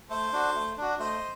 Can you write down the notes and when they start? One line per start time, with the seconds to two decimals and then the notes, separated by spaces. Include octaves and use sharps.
0.10 A3 A4 C5
0.33 D4 F#4
0.55 A3
0.77 D4 F#4
0.99 A3 C5 D#5